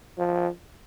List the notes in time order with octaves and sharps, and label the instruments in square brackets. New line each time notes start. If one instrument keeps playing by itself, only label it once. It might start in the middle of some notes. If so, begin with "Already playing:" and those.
[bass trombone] F3